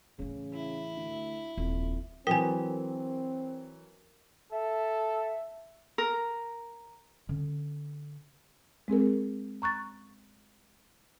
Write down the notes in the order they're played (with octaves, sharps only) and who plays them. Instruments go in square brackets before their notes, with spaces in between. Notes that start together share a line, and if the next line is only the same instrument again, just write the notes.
[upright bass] A2 E3 [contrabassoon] C#3
[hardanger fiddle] E4
[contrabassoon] D2
[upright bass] D#1 [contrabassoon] F2
[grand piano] E3 F#3 [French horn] C4 [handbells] A#4 [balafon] G5 G#5
[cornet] A4 [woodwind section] E5
[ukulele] A#4
[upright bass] D3 C#4
[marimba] G#3 C4 G#4 A#4
A#5 C#6 F#6 A6